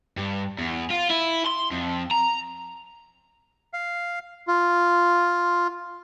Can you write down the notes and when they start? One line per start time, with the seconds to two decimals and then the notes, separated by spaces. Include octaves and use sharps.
0.17 G2
0.59 E2
0.91 F4
1.10 E4
1.47 C6
1.72 F2
2.11 A#5
3.74 F5
4.48 F4